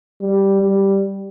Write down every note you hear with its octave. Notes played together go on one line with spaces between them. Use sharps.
G3
G3